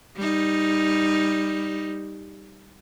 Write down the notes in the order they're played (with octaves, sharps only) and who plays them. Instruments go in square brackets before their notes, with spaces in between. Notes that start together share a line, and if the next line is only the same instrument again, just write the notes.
[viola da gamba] G3 D#4